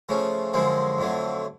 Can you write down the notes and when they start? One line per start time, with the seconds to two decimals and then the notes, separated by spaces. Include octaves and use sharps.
0.09 C#3 F3 A3 C#4
0.53 F#2 D3 F3 G#3 C4
0.98 F2 D3 F#3 A3